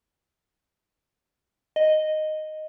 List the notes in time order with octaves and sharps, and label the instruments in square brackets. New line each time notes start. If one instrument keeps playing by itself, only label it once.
[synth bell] D#5